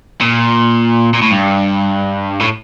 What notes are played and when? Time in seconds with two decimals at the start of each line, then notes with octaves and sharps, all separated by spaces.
0.22 A#2
1.14 A#2
1.22 A2
1.31 G2
2.41 A2